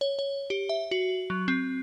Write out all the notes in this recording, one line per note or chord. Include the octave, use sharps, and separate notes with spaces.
C#5
C#5
G4
E5
F#4
F#3
C4